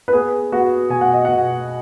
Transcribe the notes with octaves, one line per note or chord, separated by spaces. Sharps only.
B4
B3 G#4
B3 F#4
B2 G#5
F#5
D#5
B2 F#5